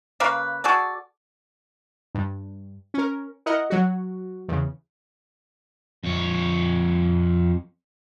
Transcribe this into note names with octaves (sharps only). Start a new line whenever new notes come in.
C#3 A#3 A#4 B4
F#4 G#4 A4 D5
G2
C#4 A#4
E4 A#4 D#5 F#5
F#3 F#4
E2 C#3
F2 C#5